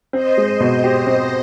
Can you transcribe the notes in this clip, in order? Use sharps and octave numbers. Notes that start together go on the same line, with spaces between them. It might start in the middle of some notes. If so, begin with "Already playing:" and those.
C4 C5 D#5
G#3
B2
G4
C4